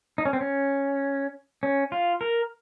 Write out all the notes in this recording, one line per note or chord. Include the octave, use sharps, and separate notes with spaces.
D#4
C#4
C4
C#4
C#4
F4
A#4